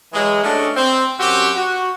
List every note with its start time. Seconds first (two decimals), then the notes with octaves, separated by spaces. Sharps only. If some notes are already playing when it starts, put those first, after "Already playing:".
0.13 E3 F#3 G#3
0.43 A3 C#4 D4 F#4 D#5
0.75 C4
1.19 F#2 C4 F#4 G4
1.56 F#4